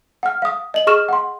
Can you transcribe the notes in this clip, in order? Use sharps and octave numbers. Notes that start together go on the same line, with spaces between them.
F#5 F6
F5 D#6
D#5 F#7
G#4 C#6 F6 E7
F#5 C6